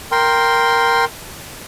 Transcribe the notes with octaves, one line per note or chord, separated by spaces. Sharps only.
A#4 G5 C6